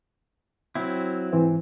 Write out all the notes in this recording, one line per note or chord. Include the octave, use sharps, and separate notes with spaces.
F#3 C4 E4
G#2 E3 C4